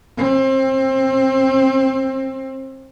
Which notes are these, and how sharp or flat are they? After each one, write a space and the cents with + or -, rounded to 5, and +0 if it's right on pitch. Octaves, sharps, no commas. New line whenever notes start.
C4 +25